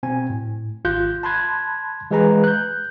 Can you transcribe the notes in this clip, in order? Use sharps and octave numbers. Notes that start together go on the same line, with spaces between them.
B2 C4 G#5
A2
G#1 F4 F#6 G6
A5 B5 C6 F#6 G#6
E3 G#3 G#4 B4 G#5 A#5
F#6 G6